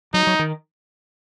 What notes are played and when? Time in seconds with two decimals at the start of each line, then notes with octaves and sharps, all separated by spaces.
0.14 F#3 D#4
0.27 F#3
0.39 D#3